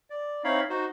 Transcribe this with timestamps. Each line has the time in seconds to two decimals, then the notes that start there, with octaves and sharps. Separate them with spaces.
0.10 D5
0.44 C4 D#4 E4 C#5 F5 B5
0.70 D#4 F#4 C5